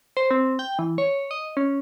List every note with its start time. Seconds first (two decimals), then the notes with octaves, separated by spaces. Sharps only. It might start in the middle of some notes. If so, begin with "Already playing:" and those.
0.17 C5
0.31 C4
0.59 G5
0.79 E3
0.98 C#5
1.31 D#5
1.57 C#4